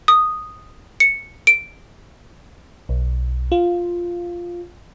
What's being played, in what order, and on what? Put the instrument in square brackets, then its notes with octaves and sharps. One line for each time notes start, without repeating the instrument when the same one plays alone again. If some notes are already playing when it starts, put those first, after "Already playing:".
[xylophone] D#6
C#7
D7
[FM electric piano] B1
F4